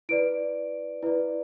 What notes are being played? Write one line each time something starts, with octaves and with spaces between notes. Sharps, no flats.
E4 B4 D5 D7
E4 B4 D5